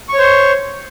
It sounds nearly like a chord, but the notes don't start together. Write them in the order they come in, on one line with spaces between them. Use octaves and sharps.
C#6 C#5 C5